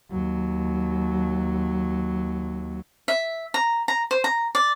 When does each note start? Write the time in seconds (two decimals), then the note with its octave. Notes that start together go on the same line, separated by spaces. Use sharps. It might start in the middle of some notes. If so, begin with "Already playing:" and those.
0.11 D#2 F#3
3.08 E5
3.54 A#5
3.88 A#5
4.11 C5
4.24 A#5
4.55 D5